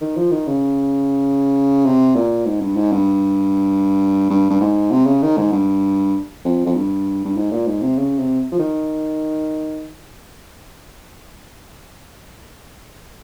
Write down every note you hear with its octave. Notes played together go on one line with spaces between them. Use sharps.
D#3
F3
D#3
C#3
C3
A#2
G#2
G2
G#2
G2
G2
G2
G#2
C3
C#3
D#3
G#2
G2
F2
F2
G2
G2
G#2
A#2
G#2
C3
C#3
C3
F3
D#3